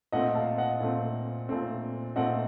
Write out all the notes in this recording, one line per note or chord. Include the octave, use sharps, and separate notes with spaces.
A#2 A3 C4 D#5 F#5
F5 A5
D#5 F#5
A#2 A3 C4
A#2 A3 C4
A#2 A3 C4 D#5 F#5